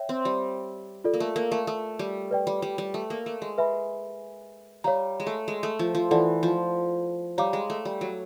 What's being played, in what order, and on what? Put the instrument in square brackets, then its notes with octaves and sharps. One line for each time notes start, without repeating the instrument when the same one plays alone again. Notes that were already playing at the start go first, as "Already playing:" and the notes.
Already playing: [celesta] C#5 E5 G5
[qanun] C4
G3
[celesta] F4 A4 D5
[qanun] A#3
A3
A#3
A3
A3
G3
[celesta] B4 D5 G5
[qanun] G3
G3
G3
A3
A#3
A3
G#3
[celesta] B4 E5 G#5 B5
[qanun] G3 [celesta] C#5 F5 A#5
[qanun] G#3
A3
G#3
A3
F3
F3
[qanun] E3 [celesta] F4 A4 D5 F#5 A5
[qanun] F3
[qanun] G3 [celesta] C#5 F5 A#5 D6
[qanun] G#3
A3
G3
F#3